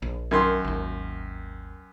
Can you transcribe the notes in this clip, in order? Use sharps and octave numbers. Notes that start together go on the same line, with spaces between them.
A#1
F#2 D#3 C6
G#1 D#2